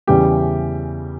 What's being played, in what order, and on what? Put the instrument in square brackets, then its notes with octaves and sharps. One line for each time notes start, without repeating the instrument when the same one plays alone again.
[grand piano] E2 C#3 E3 G3 G4